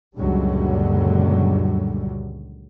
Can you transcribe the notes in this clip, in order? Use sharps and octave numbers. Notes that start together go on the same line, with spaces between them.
C#2 F#2 A#2 D3 F#3 G3